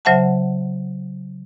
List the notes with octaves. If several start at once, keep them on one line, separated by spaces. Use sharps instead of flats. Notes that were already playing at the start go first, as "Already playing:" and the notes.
C#3 F#3 C5 E5 F#5 A5